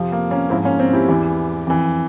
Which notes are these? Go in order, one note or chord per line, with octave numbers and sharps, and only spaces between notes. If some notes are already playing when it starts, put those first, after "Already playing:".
Already playing: F2 C3 F3
A#3
A#3 C#4
G#2 F3 C4 E4
A#3 C#4
C4
E4 G4
E2 E3
F2 E3